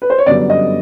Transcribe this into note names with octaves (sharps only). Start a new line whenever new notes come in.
B4
C5
C#5
G1 F#2 D3 G3 B3 D5
D#5